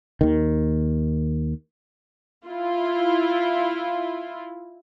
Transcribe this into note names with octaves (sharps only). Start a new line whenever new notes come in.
D#2 D#3
E4 F4